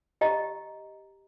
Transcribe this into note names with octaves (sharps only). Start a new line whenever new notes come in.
G4 D#5 A#5